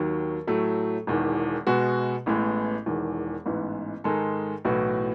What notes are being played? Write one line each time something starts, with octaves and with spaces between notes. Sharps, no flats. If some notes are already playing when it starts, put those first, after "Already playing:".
Already playing: D#2 D#3 F#3
A2 F#3 A3
E1 E2 D#3
B2 G#3 B3 F#4
A1 A2 E3 G#3 B3
E1 E2 D#3
A1 G#2 E3 B3
G#2 D#3 G#3 D#4 A4
B1 A2 E3 B3 F#4